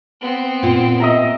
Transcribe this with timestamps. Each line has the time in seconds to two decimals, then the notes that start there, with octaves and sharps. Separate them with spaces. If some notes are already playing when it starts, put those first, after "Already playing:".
0.21 B3 C4
0.63 A#2 F4
1.00 D#5 E5 A#5